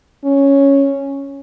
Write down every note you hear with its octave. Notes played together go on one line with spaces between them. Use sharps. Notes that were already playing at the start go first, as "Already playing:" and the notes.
C#4